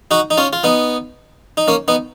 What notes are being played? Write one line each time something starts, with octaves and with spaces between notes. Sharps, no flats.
D#4 F#4
D#4
C#4 F4
F4
B3 D#4
D#4
A#3 C#4
B3 D#4